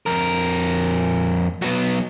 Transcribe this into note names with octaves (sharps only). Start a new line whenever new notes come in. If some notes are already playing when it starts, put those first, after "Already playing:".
F2 A#4
F#3 B3